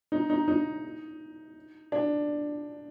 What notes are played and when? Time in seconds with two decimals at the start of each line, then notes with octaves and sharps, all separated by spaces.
0.12 D#4
0.30 D#4
0.48 D#4
1.92 D4